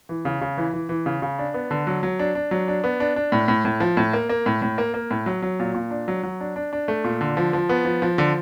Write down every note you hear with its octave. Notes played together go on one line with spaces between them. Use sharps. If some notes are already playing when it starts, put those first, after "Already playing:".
E3
C#3
C#3
E3
E3
E3
C#3
C#3
D4
B3
D3
F#3
F#3
D4
D4
F#3
D4
B3
D4
D4
A2
A2
A2
F3
A2
A#3
A#3
A2
A2
A#3
A#3
A2
F#3
F#3
A#2
A#2
D4
F#3
F#3
D4
D4
D4
A3
A#2
D3
F3
F3
B3
F3
F3
D3